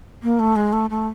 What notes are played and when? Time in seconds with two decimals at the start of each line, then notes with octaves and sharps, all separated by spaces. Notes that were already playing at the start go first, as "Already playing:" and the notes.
0.23 A#3
0.39 A3
0.56 G#3
0.73 A3
0.90 A3